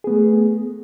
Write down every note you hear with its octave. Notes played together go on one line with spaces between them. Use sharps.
A3 B3 G#4